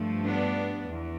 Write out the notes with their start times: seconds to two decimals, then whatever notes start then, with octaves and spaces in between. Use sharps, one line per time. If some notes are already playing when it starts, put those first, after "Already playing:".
Already playing: G2 F3 A3
0.25 B3 D4
0.88 E2